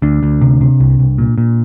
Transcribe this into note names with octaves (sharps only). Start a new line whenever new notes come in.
D2 D4
D2
C3
C3
C2
C2
A#2
A#2